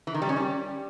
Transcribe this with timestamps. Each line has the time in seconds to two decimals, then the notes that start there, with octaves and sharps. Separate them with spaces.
0.07 E3
0.14 D#3
0.22 G3
0.29 C#4
0.36 G3